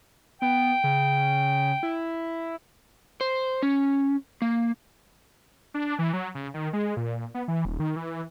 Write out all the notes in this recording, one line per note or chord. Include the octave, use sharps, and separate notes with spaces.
B3 G5
C#3
E4
C5
C#4
A#3
D4
E3
F#3
C#3
D#3
G#3
A#2
B3
E3
D#1
D#3
E3